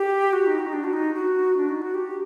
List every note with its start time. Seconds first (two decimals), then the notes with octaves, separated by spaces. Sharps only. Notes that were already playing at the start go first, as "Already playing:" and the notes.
Already playing: G4
0.33 F#4
0.46 D#4
0.59 F#4
0.67 D#4
0.73 D4
0.84 F#4
0.93 D#4
1.14 F#4
1.57 D4
1.69 D#4
1.82 F#4
1.95 G4